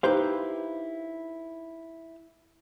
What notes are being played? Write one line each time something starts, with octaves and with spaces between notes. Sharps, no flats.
D#4 E4 G4 B4 C5 F5